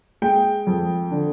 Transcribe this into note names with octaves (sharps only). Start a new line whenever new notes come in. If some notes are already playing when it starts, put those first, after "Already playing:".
G#3 G5
F2
D3